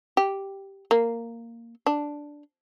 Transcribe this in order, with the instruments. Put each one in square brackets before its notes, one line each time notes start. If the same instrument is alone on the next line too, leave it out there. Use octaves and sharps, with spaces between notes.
[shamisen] G4
A#3
D4